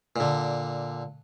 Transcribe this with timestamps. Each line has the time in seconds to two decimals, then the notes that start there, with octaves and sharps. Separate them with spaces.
0.16 A#2 D3